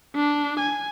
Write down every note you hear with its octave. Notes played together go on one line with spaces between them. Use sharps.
D4
G#5